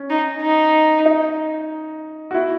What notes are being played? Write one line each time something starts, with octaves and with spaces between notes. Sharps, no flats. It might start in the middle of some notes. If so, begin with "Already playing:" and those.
Already playing: C#4
D#4
D#4
D#4
F#4
E4